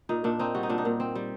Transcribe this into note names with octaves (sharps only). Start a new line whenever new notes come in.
A#2 D#4
A#2 D4
C4 D#4
G3 F#4
D#4
A#2 D4
D#4
A#2
C4
G3